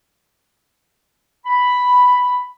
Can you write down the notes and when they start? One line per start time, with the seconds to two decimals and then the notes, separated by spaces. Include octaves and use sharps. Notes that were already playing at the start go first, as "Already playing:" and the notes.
1.46 B5